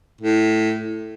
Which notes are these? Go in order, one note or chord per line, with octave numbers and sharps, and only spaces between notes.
A2